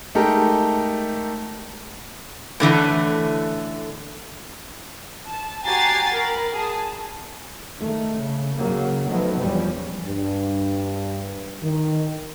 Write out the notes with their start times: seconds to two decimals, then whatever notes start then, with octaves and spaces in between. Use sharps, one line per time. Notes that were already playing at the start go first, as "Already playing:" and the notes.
0.15 G#3 A3 D#4 G4 A4 A#4
2.60 A2 D3 E3 A3
5.27 A5
5.65 F#4 G4 G#5 A#5 A6 C7
6.13 A#4 B5
6.52 G#4 A5
7.79 D#3 A3
8.18 C#3
8.56 C#3 F#3 A#3
9.07 D#3 F3 F#3 A3 B3
9.40 E2 F3 G3 C#4
10.04 G2
11.62 D#3